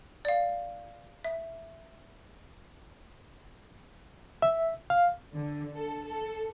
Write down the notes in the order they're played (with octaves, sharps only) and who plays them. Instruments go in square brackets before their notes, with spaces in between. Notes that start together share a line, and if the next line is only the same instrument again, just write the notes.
[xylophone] D5 F5
E5
[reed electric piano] E5
F5
[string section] D3
A4
A4